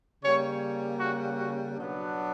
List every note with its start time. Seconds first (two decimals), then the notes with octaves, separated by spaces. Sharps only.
0.23 C#3 G3 A#3 C#5
1.00 F#4
1.38 F#4
1.77 B2 F#3 B3 D4